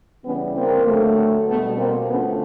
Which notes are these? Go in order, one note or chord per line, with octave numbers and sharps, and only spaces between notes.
C#3 E3 G3 B3 C#4
A#3 C4
D3 F#3 A3
B2 G3 A3 B3
A#3 C4
D3 F3 A3 B3 C#4